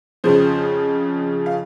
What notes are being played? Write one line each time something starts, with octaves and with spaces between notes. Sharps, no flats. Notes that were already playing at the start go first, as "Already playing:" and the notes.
F2 C#3 F3 G#4 C5
F5